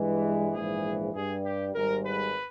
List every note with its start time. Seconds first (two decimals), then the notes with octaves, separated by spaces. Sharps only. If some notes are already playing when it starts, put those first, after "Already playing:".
Already playing: G2 E3 G#3
0.53 A#1 G#2 E3 G#3 G#4
1.14 G2 G3 G#4
1.44 G4
1.74 G#1 G#2 G3 A#4
2.05 B4